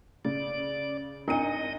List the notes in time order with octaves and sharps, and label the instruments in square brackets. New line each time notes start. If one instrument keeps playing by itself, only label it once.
[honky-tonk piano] C#3 [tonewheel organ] D5
[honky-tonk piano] G#1 C#7 D#7 [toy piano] D4 E4 A#4 [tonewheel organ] D#5